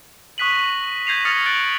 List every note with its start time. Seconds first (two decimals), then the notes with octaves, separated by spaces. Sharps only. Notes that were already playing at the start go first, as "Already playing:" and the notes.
0.38 C#6 D#6 F#6 B6 D#7 F#7
0.53 A#6
1.07 G6 G#6 A#6 C7 D#7 F7
1.25 D#6 F6 A6 A#6 C#7
1.46 F#6 A6 D7 F#7